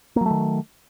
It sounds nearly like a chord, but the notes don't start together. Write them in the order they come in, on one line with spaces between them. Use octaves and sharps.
A#3 F#3 A3 D#3